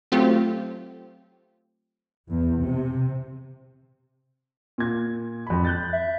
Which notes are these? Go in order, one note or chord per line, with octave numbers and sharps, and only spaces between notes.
F#3 A3 C4 F4 G4
E2
C3
A#2 G#6
F2 B5
F#6 G6 A6
E5